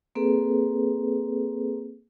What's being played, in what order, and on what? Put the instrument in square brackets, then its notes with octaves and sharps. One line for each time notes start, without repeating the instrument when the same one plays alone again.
[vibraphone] A#3 C4 G#4 A4 B4